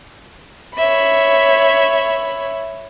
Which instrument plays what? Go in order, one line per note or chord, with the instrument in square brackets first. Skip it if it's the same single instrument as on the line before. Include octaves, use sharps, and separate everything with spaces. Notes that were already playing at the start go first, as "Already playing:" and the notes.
[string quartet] C#5 E5 B5